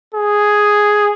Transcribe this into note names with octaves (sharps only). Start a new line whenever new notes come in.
G#4